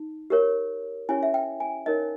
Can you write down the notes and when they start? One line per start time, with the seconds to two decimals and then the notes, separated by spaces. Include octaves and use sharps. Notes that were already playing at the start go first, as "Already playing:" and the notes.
Already playing: D#4
0.30 G4 A#4 C#5
1.09 C#4 E4 G4 C#5 G#5
1.23 E5
1.34 G5
1.60 G#5
1.86 D#4 A#4 C#5 D#5